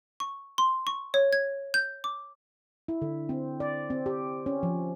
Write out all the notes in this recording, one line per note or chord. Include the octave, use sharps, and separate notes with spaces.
C#6
C6
C#6
C#5
G#6
G6
D6
E4
D3
C4
D5
C4
G4
C#4
F3